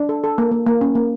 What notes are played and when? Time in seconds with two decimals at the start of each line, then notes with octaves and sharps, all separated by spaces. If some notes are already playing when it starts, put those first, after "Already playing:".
Already playing: D4
0.09 A4
0.24 A4
0.38 A#3
0.51 A#3
0.67 A#3
0.81 C#4
0.95 A#3